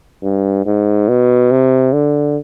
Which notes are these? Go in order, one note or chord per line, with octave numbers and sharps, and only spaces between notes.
G2
G#2
B2
C3
D3